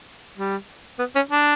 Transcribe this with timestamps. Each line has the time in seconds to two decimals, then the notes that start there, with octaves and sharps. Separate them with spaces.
0.37 G3
0.99 B3
1.15 C#4
1.31 D4